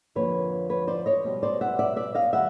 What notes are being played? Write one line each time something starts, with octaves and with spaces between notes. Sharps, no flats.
F2 D3 F3 A#3 B4 C#5
B4 C#5
C5 D5
C#5 D#5
B2 G3 B3
C5 D5
E5 F#5
D5 E5
D5 E5
D#5 F5
D#3 G3 E5 F#5